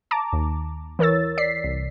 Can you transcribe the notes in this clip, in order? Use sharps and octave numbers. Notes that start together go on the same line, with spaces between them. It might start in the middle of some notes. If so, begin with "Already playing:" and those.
A5 A#5 D6
D#2
E3 A#4 C#5 E6 A6
D5 B6 C7
C2